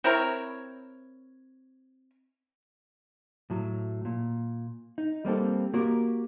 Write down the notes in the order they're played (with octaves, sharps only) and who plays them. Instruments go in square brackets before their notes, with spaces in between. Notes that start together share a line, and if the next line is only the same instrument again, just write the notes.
[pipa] C4 E4 A#4 C#5
[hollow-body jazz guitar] A2 F#3
A#2
D#4
G3 A#3 C4 A4
A#3 F#4 G4 A#4